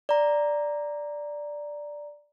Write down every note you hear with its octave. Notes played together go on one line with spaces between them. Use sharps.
D5 A#5